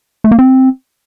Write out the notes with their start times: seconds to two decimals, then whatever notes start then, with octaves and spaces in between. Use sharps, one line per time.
0.24 A3
0.31 A#3
0.39 C4